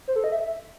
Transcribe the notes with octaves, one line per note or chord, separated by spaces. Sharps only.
C5
A4
D#5
E5